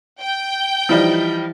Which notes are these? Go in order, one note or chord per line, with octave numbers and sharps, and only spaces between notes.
G5 G6
E3 F3 G3 D#4